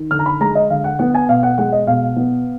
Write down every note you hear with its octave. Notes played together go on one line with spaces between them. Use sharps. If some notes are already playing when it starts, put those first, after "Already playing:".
Already playing: D#3
D3 F6
A#5
B5
G#3 A#5
D#5
D3 F5
F#5
B3 F#5
G#5
B2 F5
F#5
G#3 F#5
D#5
B2 F5
B3